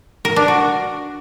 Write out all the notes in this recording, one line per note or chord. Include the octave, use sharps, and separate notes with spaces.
A#4
D4
F#4